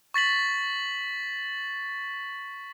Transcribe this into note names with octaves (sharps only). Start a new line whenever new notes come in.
C#6 A6 B6 F#7